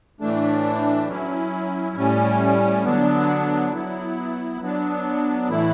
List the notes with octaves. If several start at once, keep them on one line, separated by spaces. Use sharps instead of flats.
A2 E3 A3 D4
F#3 C#4 E4
A2 G3 C#4
D3 F#3 B3 D4
F#3 B3 E4
F#3 B3 D4
A2 E3 A3 E4